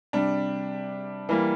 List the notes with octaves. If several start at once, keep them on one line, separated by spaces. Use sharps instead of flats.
C3 G3 D4
E3 G3 A#3